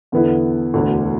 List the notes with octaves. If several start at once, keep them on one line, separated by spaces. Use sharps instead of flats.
E2 D3 B3 E4 A4
E1 D2 D3